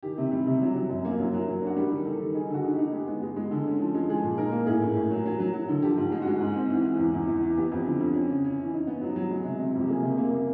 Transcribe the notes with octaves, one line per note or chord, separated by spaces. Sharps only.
D#3 G4
C3
G3
C3
F#3
F#3
F#2
A#3
F#3
F#3
F#3
D4 F#4
G3 G4
D#3
D#3 A4
D#3
D#4 G#4
D3 F#4
D#4
G4
D#4
G#3 G4
B3
G#3
G#3
D3
C#4
F3
G#3
F3 G#4
A#2
D#4 A#4
A#3
A2 G#4
A2
A2
F#3
F#3
F#3
F#3
D3
F3 G4
G#2
G#3
G#3 F#4
G#2
C4
E3
E3
E2
E2
E2
E3
B3 G4
F2
D3
F2
C#4
C#3
C#4
E3
D#4
B3
F#3
F#3
G#3
C3
C3
F2
G4
A#3 G#4
C3
A#3
A#3